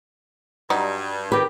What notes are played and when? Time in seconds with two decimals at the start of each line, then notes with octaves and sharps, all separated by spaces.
0.70 G2 F#3 G3 D#4
1.32 D#3 G4 B4